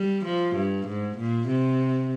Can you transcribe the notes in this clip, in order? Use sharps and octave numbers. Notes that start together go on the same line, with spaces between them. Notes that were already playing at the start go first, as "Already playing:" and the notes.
Already playing: G3
F3
G2
G#2
A#2
C3